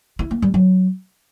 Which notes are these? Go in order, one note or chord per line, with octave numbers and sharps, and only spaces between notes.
E4
A#3
G3
F#3